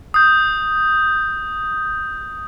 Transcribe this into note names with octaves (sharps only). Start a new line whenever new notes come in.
D#6 G6